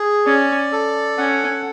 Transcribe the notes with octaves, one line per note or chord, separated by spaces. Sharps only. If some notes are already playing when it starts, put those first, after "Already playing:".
Already playing: G#4
C#4 D5
A4
C#4 F#5